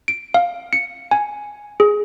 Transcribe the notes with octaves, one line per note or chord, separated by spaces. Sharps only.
D7
F5
C#7
G#5
G#4